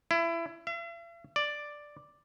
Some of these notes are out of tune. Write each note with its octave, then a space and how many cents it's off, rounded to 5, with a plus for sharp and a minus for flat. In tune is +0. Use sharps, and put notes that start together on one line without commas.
E4 +25
E5 +45
D5 +5